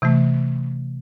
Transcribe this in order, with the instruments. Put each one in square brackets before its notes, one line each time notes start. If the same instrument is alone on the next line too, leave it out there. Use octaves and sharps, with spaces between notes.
[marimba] C3 E3 A3